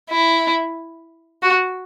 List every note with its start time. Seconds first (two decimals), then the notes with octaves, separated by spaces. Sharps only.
0.10 E4
1.42 F#4